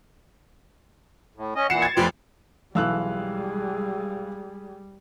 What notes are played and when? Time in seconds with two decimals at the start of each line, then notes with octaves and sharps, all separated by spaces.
1.36 A2
1.56 C#4 D#5
1.70 A#2 E3 F#5 C7 C#7 E7
1.82 G#6 A6
1.97 F1 F3 B4 G5 C6
2.75 B1 E3 G3 G#3 G#4 F5 E6 F#6